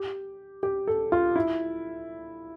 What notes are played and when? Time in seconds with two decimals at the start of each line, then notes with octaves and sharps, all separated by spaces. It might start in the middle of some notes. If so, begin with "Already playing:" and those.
Already playing: G4
0.63 G4
0.87 A4
1.12 F4
1.36 E4